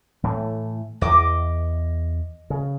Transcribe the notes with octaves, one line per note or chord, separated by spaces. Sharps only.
A2 E3 A3
E2 D#5 D6 D#6
C#3